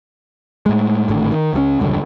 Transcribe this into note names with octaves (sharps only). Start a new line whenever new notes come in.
A2 G#3
G#1 A2 D3
D#3
C#2 F#3 C#4
E1 C#2 G2 D3